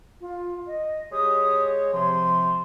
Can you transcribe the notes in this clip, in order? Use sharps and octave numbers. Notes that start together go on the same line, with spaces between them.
F4
D#5
G#3 G4 C#5 D#6
C3 F3 C6